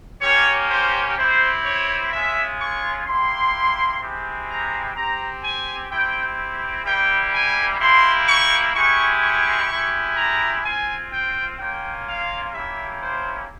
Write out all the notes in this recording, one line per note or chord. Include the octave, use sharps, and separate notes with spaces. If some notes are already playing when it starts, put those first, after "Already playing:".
A#3 C#4 G4 C#5
C5
C4 E4 G4 C5
C#5
G#3 C#4 F4 E5
C#6
A#3 E4 G4 C6
G#3 C4 E4 G4
A#5
C4 G4 A#5
G#5
C4 E4 G4 G5
G3 A#3 E4 G4 G5
G#5
A#3 E4 G4 C6
C#6
G#3 E4 G4 C#6
C#6
G#3 E4 G4
A#5
C4 F4 G#5
G5
A#3 C#4 F4 G5
F5
A#3 C#4 E4 G4 E5
C5